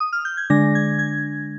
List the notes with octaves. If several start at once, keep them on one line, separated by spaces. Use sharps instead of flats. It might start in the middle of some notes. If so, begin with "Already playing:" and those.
D#6
F6
G6
G#6
D3 G#3 D4 A#6
G#6
G#6